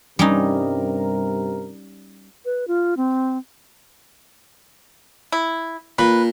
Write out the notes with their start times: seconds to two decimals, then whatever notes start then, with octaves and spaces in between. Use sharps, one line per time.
0.19 G2 C3 G3 C#4 D#4 A#4
2.45 B4
2.68 F4
2.97 C4
5.32 E4
5.99 A#2 B4